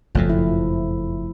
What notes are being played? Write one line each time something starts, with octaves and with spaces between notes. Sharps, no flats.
F#1 F2 B2 F3 A3
F3 E4